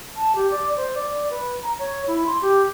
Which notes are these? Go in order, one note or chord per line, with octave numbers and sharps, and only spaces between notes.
A5
G4
D5
C5
D5
B4
A#5
C#5
E4
C6
G4